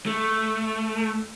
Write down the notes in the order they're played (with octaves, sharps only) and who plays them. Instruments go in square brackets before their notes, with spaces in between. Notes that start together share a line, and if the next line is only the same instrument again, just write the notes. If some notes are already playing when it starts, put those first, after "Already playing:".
[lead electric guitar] A3